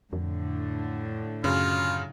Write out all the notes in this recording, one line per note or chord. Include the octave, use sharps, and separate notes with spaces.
F2 A2 D3
F#2 C#3 F#3 F4